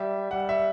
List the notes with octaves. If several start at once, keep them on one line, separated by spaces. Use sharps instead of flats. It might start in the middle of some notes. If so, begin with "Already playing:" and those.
Already playing: G3 E5
G3 F#5
E5